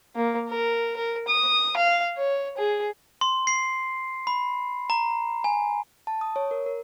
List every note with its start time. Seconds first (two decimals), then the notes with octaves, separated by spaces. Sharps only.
0.16 A#3
0.49 A#4
0.97 A#4
1.28 D#6
1.76 F5
2.17 C#5
2.57 G#4
3.21 C6
3.47 C7
4.27 B5
4.90 A#5
5.44 G#5
6.07 A5
6.21 D#6
6.36 C#5
6.51 A#4
6.66 A#4